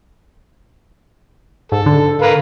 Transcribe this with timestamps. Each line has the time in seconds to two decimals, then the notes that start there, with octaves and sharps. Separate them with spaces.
1.72 G#2 A4
1.86 D3
2.22 A#4 B4 F5